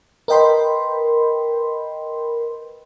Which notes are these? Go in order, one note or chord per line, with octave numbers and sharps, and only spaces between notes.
A#4 B4 D#5 G5 B5 C6